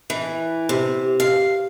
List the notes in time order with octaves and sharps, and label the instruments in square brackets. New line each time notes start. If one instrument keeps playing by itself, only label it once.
[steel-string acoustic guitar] E3
C3
F5